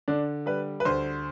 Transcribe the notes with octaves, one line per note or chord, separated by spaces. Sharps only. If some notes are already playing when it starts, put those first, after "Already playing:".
D3 D4
G3 B4
B4
D2 C5